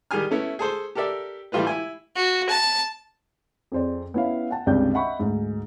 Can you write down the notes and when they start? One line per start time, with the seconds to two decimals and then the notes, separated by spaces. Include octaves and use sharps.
0.11 D#3 G3 G4 G#4 G#5 F6
0.31 A3 B3 C#4 E4
0.59 G#4 A4 C5
0.95 G4 A4 A#4 D5 E5
1.52 E3 G3 A3 F4 G4 B4
1.67 E4 G#5
2.16 F#4
2.50 A5
3.72 F2 G#4 C5 D5
4.14 B3 C#4 E4 E5 F5
4.51 F#5 G5 A5
4.67 C#2 G2 C3 D5 G5 G6
4.94 D#5 E5 F#5 B5 C#6
5.19 D2 G#2